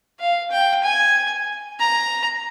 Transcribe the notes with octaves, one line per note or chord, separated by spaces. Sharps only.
F5
G5
G#5
A#5